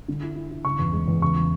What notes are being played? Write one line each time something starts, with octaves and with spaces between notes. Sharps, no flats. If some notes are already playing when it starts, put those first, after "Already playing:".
D3
E4
E4
E4
C#3 C#6
E2
G#3
E2
C#3 C#6
E3